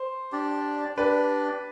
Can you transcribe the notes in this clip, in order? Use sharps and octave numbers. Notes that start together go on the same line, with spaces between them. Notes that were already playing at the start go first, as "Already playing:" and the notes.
Already playing: C5
D4 G4 D5
D4 G4 B4 D5